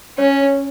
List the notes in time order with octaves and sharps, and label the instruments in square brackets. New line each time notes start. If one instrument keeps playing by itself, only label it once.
[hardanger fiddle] C#4 [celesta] C#5